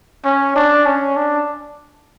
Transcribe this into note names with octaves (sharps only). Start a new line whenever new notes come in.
C#4
D4
C#4
D4